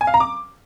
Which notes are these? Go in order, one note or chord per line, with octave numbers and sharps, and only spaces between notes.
G#5
F5
A#5
D6